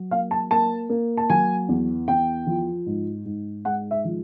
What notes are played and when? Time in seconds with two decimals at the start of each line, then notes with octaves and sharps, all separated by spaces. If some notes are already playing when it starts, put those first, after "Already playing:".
Already playing: F#3
0.11 A#3 F5
0.31 A5
0.51 A#3 A5
0.89 A#3
1.17 A5
1.30 F#3 G#5
1.69 E2
2.08 E2 G5
2.47 F3
2.86 G#2
3.25 G#2
3.65 G#3 F#5
3.91 E5
4.05 F3